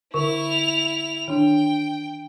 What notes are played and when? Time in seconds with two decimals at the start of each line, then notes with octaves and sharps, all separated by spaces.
0.14 D3 E4 A#4 C#6 F7
1.28 D#3 D4 G5